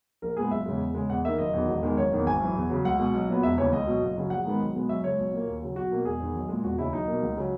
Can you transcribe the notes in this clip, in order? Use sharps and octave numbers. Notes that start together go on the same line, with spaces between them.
A#1 A#4
A#2 G#3 B3 G#4
F#1 E5
E2 C#3 G#3
E2
C#3 G#3
E2 F#5
D#3 A#3 E5
F#1 D#5
E2 D#3 F#3
E1
E2 D#3 G#3
F#1 C#5
E2 D#3 A#3
G#1 G#5
F#2 E3
E2
C#3 F#3
C#2 F#5
B2 G#3
B1
A#2 F#3 B3
E1 E5
D#2 C#3 E3 C#5
C#2 D#5
B2 F#3
F#1
F#2 C#3 F#3
A#1 F#5
G#2 D#3 G#3 B3
B1
B2 G#3 B3
F#2 E5
C#3 G#3 C#5
B1
A#2 A#3
D#2
C#3 F#3
B1 F#4
B2 A#3
E1 G#4
E2 D#3
B1
A#2 G#3
E1 F#4
D#2 C#3 E4
B1 D#4
B2 A#3
C#2
C#3 F#3